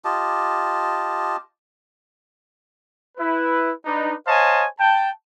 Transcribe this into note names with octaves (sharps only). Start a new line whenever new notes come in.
F4 G4 D#5 A5
E4 B4
D4 D#4 B4
C5 C#5 D#5 F5 G#5 A5
G5 A5